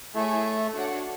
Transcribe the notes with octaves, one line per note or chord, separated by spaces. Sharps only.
A3 E4 G#4 C#5 E5 G#5
D4 F#4 A4 C#5 F#5